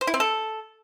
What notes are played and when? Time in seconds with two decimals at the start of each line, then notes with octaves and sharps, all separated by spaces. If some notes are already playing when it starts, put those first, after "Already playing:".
0.01 C5
0.07 E4
0.14 C4
0.20 A4